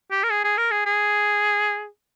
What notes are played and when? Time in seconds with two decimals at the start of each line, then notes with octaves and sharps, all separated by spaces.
0.11 G4
0.24 A#4
0.30 G#4
0.44 G#4
0.58 A#4
0.71 G#4
0.86 G#4